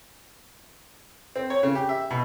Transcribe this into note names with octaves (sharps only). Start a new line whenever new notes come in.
C4
C#5
C#3
G4
E5
B2